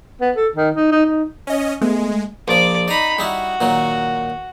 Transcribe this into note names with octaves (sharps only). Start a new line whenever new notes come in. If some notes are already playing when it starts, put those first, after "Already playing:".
B3
A4
D#3
D#4
D#4
D#4
C#4 D#5
G#3 A3 B3
A#1 F3 D5
D#4 D5 A#5 B5
G3 D#4 E4 F#4
A#2 D#3 F#3